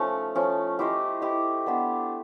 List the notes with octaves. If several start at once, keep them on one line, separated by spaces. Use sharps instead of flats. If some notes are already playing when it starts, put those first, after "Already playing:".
Already playing: F3 A3 C#4 D#4 C#5
F3 A3 C#4
E4 G4 C5 D#5
E4 G4 C5 D#5
B3 D4 G4 C5